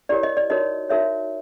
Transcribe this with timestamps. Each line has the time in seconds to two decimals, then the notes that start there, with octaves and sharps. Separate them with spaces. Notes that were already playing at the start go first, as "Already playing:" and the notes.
0.09 E4 G4 A#4 C#5 D5
0.23 D#5
0.37 D5
0.50 D#4 F#4 A#4 C#5 D#5
0.89 D#4 F#4 A#4 C#5 E5